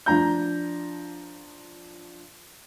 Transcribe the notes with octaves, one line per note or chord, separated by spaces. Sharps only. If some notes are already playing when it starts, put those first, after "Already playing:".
F3 D4 A#5 G6